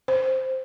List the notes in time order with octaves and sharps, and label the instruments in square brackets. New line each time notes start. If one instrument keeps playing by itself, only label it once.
[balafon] C5